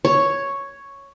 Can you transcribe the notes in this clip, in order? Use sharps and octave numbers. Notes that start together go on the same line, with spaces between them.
C#5